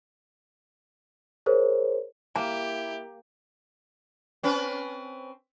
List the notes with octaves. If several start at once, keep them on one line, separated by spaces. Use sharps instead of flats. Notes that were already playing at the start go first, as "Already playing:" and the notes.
G#4 A#4 C5 C#5
A#3 E4 G4 A#5
C4 C#4 B4